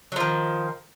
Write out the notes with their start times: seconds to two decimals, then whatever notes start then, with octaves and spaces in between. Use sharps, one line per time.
0.12 F#3
0.16 F3
0.20 D#3